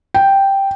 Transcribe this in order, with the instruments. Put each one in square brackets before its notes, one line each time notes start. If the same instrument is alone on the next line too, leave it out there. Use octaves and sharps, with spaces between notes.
[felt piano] G5